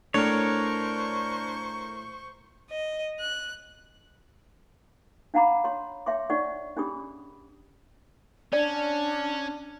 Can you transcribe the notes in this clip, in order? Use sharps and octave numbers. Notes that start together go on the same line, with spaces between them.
A2 D4 A#4 C5 C#5 C#6
D#5
F#6
D4 F5 F#5 A#5 B5 D6
C#5 C6
C#5 E5 G5 C6 D6
D4 C#5 D5 F#5 C#6
C#4 D4 G4 G#4 B5 D#6
C#4 D4 D5